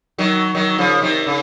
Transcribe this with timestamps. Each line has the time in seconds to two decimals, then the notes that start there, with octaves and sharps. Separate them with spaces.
0.18 D#3 F#3
0.55 D#3 F#3
0.78 C#3 F3
1.02 C3 D#3
1.27 C#3